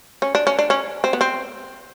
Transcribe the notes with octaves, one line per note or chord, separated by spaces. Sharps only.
C#4
D4
C#4
D4
C#4
C4
B3
C4